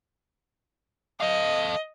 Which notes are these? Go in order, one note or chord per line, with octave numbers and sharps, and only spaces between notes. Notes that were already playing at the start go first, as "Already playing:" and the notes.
A4 D#5 F5